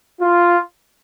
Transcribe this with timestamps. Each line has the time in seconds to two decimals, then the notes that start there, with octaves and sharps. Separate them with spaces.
0.20 F4